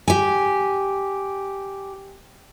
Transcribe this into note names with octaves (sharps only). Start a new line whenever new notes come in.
G4 G#5